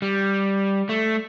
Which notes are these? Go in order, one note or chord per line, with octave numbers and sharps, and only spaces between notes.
G3
A3